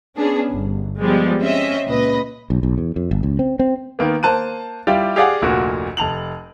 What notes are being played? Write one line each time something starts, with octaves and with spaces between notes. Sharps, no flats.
B3 C#4 D4 G#4
G1
F3 G3 G#3 B3
C4 C#4 D#5 E5
C#2 A#2 B4 D#5
B1
B1
E2
F2
G1
C#2
C4
C4
D#3 A#3 B3
A#3 C5 A5 F#6 D#7
G3 E4 F4 G4 D5
G4 G#4 D5 F5 F#5 G#5
F1 D2 A#2 F#4
F1 A5 F7 F#7